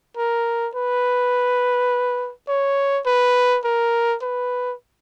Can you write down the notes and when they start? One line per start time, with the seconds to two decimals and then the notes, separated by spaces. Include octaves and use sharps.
0.17 A#4
0.75 B4
2.48 C#5
3.06 B4
3.64 A#4
4.22 B4